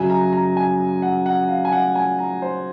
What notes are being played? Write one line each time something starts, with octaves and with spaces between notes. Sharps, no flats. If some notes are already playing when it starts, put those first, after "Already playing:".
Already playing: F#2 C#3 F#3 G#5
A#5
A#5
G#5
F#5
F#5
F5
G#5
F#5
G#5
A#5
C5